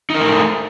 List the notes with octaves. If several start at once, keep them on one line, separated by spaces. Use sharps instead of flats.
A3 D#4 A#4